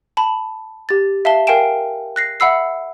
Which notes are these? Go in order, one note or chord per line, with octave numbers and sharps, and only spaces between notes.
A5 B5
G4 A6
E5 F5 A5 G7
A#4 F5 G5 G#5 D7 E7
F#6 A#6 C7
E5 F#5 B5 E6 C7